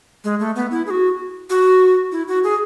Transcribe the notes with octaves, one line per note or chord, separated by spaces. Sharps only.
G#3
A3
B3
E4
G#4
F#4
F#4
E4
F#4
G#4